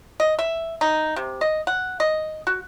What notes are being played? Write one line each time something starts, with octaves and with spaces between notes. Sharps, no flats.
D#5
E5
D#4
C3
D#5
F#5
D#5
F#4